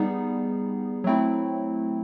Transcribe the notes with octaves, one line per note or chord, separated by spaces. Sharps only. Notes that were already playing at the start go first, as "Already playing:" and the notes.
Already playing: G3 B3 D#4 G#4
F#3 A3 C4 E4